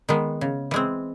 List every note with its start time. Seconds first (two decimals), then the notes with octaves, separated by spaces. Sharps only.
0.09 D#3 G#3 B3
0.41 C#3
0.71 E3 G#3 C4